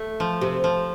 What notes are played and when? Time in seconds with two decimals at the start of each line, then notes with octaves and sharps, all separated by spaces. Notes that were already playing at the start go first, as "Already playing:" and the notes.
Already playing: A3
0.20 F3
0.41 C3
0.64 F3